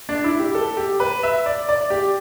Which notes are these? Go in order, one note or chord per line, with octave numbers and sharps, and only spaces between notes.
D4
E4
G4
A4
G4
B4
E5
D5
D5
G4